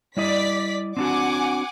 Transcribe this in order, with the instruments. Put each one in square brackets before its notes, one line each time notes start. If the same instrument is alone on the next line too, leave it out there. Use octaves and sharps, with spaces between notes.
[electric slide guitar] G3 E4 D#5 [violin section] D5 B6
[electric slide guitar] C4 D4 F#4 [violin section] F#5 G#5 D6